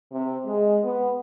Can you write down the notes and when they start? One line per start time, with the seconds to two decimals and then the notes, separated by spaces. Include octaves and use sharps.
0.12 C3
0.46 G#3
0.83 B3